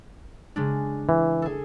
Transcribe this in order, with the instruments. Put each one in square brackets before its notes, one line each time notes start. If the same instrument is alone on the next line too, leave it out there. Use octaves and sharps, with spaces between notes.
[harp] C#3 G#3 D4
[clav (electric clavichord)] E3
[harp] G#4 A4